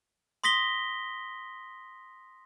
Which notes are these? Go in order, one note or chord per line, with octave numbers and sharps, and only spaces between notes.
C6 D#6 A#6 B6 G7